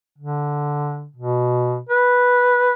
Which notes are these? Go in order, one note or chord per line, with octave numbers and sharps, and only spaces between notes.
D3
B2
B4